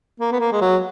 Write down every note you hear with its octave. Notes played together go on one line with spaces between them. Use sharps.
A#3
B3
A#3
G#3
F#3